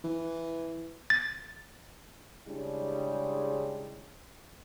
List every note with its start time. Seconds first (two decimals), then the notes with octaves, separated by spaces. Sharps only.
0.04 E3
1.10 A6
2.48 C#3 G3 G#3 D4 E4